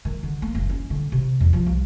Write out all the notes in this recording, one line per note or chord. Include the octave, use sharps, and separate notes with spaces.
D#3
D3
A#3
F#1
C#4
D3
C3
E2
F3
C2